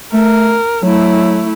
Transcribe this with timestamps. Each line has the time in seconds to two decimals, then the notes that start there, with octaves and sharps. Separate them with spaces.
0.14 A3 A#4
0.83 F#3 A3 E4